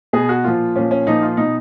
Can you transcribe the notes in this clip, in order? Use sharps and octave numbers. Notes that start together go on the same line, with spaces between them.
B2 G#4
F#4
A#2 F3 F4
A#2 F3 C#4
C#4
A#2 F3 D#4
F4
B2 D#4